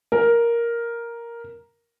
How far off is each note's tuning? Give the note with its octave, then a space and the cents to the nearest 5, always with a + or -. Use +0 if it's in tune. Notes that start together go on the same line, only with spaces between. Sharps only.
A#4 +5